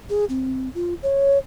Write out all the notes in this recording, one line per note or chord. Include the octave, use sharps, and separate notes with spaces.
G#4
C4
F4
C#5